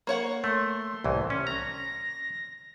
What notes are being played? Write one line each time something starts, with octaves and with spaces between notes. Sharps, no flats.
A#3 C#5 F#5
A3 C6
C2 A2 E3
C#4
A#5 A#6